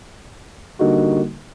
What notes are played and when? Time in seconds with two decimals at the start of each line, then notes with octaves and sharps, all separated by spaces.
0.79 D3 G3 A#3 D#4 F#4